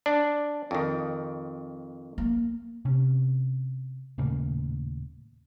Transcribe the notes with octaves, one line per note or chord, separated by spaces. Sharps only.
D4
F2 D#3
A#3
C3 C#4
D#1 A2 C#3 A#3